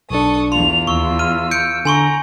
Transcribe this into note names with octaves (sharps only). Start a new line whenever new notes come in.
B1 D4 A4 C#6 D#6
E2 F4 C6 F7
D#2 C#6 E6
F6 D#7
G6 C#7 D7
D3 G#5 A#5 C6 C#6